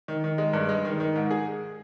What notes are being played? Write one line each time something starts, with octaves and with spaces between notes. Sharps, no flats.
D#3
D#3
G#3
G2
G#3
D#3
D#3
G#2
G#4